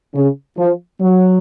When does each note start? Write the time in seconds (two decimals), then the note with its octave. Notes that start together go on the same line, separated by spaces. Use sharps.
0.14 C#3
0.57 F3
1.00 F#3